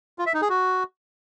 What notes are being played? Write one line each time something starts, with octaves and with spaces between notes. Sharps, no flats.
F4
E5
D#4
G#4
F#4